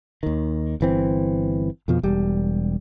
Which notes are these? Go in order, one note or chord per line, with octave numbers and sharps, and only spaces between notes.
D#2 D#3
G1 E3 C4
F2 B2 F3
E1 G3